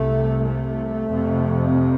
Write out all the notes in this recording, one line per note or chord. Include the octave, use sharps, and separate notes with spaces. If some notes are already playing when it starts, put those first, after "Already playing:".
Already playing: C2 C3 A3
A3
F2 C3